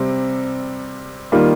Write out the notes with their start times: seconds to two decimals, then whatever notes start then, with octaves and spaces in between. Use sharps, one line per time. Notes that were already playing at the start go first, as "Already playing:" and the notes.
Already playing: C3 G3 C4
1.32 D#3 G3 A#3 F4